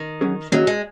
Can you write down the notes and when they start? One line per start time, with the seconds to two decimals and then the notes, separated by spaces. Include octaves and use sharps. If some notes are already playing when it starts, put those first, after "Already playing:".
Already playing: D#3
0.21 F#3 C#4 G#4
0.52 D#3 F#3 A#3 C#4 G#4 D#5
0.67 G#3